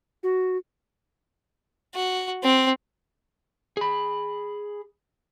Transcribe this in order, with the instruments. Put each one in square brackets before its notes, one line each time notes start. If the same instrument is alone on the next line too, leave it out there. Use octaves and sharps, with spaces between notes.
[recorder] F#4
[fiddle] F#4
C4
[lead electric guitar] G#4 B5